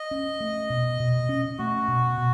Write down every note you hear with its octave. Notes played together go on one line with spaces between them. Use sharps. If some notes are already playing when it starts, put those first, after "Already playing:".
Already playing: D#5
C#4
A3
B2
B2
C#4
A3 F#4
B2
B2